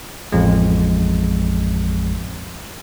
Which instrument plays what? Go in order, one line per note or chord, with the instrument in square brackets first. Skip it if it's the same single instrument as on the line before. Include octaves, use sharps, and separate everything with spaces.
[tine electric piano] A1 F2 G#3